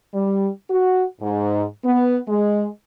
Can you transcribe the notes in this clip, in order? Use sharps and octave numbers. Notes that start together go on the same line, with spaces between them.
G3
F#4
G#2
B3
G#3